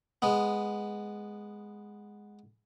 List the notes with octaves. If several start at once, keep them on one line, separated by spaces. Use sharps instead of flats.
G#3 B3